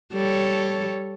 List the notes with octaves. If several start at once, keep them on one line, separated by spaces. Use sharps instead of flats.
G3 A4 C#5